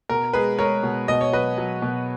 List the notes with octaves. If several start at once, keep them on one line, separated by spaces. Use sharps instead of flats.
B2 A#4
G#3 G#4 B4
G#3 A#4 C#5
B2
B2 D#5
C#5
F#3 B4 D#5
F#3
B2